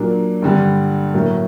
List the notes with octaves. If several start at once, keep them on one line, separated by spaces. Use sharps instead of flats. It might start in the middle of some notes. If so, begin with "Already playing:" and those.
Already playing: A#2 F#3 A#3 D4
G2 D3 G3 D4
A2 F#3 A#3